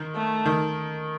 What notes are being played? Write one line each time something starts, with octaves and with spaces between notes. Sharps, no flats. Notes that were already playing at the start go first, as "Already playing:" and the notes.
Already playing: D#3
A3
D#3